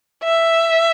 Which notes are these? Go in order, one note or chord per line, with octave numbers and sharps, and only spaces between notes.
E5